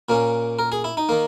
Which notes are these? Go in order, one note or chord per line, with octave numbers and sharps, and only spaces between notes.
A#2 A#3 C#4
A#4
G#4
E4
D#4
D#3 A#3